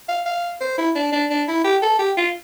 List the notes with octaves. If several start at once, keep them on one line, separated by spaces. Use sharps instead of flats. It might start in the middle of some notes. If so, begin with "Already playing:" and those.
F5
F5
C5
E4
D4
D4
D4
E4
G4
A4
G4
F4